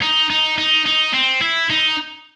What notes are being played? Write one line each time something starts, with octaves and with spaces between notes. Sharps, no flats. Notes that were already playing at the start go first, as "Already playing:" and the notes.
D#4
D#4
D#4
D#4
C4
E4
D#4